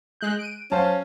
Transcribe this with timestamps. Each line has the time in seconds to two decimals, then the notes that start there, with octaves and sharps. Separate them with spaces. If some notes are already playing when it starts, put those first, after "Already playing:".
0.21 G#3 F#6 G6
0.39 D7 D#7
0.72 F#3 C#4 C5 F5 A5